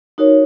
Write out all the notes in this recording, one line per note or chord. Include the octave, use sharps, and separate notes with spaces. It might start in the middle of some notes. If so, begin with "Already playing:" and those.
D#4 F#4 A#4 C#5